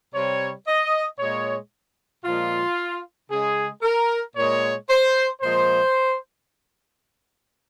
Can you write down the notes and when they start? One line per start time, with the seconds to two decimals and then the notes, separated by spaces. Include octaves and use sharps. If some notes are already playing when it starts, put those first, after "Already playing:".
0.14 C3 G3 C#5
0.67 D#5
1.19 A#2 G#3 C#5
2.25 A#2 F3 G#3 F4
3.31 C#3 G#3 G#4
3.83 A#4
4.36 A#2 G#3 C#5
4.89 C5
5.41 A#2 F3 G#3 C5